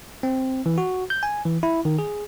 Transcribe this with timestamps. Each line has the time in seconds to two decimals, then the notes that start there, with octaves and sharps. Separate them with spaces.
0.23 C4
0.66 E3
0.78 F#4
1.10 G6
1.23 G#5
1.45 E3
1.63 E4
1.85 D#3
1.99 G#4